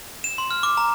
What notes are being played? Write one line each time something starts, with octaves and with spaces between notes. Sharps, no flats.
E7
C6
F6
D6
A#5